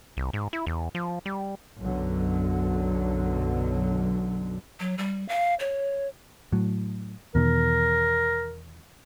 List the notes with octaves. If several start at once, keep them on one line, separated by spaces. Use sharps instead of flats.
C2
G#2
E4
E2
F3
G3
B1 F#2 B2 D3 F#3
F#3
G3
F5
C#5
A2 F#3
E2 B2 D#3 A#4